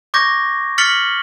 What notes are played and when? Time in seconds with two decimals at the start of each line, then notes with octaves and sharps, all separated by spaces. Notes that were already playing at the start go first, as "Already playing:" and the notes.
0.14 C#6 D6 G6 G#6 A#6
0.78 F6 A6 B6 C#7 F#7 G7